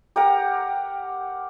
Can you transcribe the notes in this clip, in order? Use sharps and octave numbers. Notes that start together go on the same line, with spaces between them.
G4 A#4 F#5 A#5